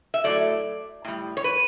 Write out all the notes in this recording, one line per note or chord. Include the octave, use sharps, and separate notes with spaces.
E5
A2 F#3 A3 D5
A2 G3
C#5
B4